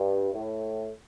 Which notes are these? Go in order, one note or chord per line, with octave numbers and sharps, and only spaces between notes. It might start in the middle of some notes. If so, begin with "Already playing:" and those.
Already playing: G2
A2